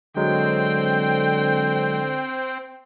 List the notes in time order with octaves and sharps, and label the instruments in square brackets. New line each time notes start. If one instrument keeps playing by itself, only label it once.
[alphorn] D3 [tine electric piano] F#3 G#3 [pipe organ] C4 [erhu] G5